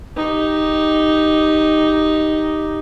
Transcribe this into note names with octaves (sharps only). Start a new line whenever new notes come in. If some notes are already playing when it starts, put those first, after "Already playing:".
D#4 G4